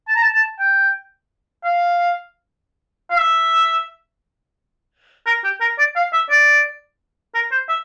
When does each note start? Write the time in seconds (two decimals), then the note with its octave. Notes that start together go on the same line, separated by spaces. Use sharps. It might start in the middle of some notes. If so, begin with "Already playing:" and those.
0.08 A5
0.15 A#5
0.22 A5
0.34 A5
0.59 G5
1.63 F5
3.10 F5
3.19 E5
5.26 A#4
5.44 G4
5.61 A#4
5.78 D5
5.96 F5
6.13 E5
6.30 D5
7.34 A#4
7.51 C5
7.69 E5